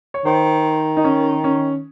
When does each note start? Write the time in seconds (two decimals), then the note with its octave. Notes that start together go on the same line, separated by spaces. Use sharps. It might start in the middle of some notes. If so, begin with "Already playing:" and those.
0.14 C#5
0.25 D#3 C5
0.97 D#4
1.04 C#4
1.44 C#4